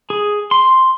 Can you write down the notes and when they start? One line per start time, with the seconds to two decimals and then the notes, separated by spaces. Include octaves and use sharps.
0.10 G#4
0.51 C6